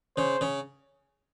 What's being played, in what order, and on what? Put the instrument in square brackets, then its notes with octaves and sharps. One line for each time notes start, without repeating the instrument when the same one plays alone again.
[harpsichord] C#3 [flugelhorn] C5
[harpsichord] C#3